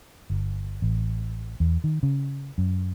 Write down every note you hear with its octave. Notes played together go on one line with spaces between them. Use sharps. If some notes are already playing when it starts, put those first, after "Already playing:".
G1
A1
E2
D#3
C#3
F#2